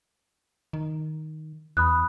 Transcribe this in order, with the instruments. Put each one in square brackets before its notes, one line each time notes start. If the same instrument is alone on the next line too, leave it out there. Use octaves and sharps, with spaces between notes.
[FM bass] D#3
[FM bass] E2 [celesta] B5 D#6 F#6